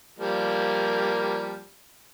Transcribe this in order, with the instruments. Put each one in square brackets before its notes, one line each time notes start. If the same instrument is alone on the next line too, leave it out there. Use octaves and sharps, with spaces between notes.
[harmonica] F3 G3 A#3